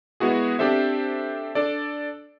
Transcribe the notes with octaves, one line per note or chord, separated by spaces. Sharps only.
G#3 B3 E4 F#4 G#4
C4 D4 G4 A4 C5 E5
D4 A4 D5